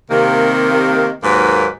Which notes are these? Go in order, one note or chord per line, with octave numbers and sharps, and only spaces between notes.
C3 D#3 A#3
D#2 G#2 F#3 A#3 A#4 B4